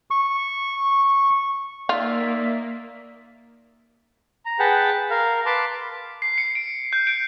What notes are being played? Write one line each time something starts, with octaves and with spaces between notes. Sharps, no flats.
C#6
A#3 D#4 F4 D5 E5
A#5
G#4 B4 F#5 G5 A5
A#4 F5
B4 A5 C6 D6
C7
C#7
D7
G6
D7